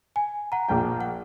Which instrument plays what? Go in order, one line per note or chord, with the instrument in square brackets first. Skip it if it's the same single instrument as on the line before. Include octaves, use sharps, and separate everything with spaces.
[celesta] G#5
F#5 A#5
[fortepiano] A#1 F3 G5
[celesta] F#5